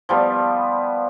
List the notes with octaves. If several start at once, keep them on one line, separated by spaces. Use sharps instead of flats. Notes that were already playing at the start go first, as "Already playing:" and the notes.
F3 G3 B3